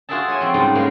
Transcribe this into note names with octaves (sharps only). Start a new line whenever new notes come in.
F4 F#4 G#4 A#4 E5 A5
C#5 E5 G#5
F3 C4
G#2 C#3 G3 F#4
G#3 A#3 C#4